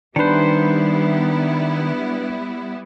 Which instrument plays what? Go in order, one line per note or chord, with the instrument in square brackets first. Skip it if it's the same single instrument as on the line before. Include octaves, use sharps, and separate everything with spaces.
[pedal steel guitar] D#3 C5 [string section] G3 B3 E4 [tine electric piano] D4 B4